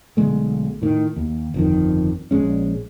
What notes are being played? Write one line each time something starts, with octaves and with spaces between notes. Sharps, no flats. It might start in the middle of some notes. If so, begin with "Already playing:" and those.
B1 D3 G#3 A3
A2 D#3
D#2
G1 F2 D#3
A#1 G#3 C#4